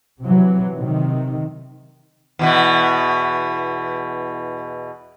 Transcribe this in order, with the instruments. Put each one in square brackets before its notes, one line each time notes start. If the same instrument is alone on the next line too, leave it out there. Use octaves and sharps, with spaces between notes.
[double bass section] C3 E3 F#3
C3 D#3
[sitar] E2 B2 E3